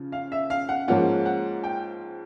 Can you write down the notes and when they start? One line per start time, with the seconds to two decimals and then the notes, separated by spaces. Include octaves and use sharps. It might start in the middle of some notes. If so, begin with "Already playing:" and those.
Already playing: C#3 F3
0.12 F5
0.32 E5
0.50 F5
0.69 F#5
0.88 G#2 F3 A#3 C#4 F4 F#5
1.26 F#5
1.64 G5